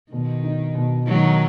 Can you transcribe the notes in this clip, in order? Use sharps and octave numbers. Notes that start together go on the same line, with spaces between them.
B2 D#3
D#4
B2
D#3 F#3 D#4